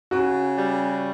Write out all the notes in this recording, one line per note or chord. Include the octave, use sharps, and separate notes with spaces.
C#3 F#4
G3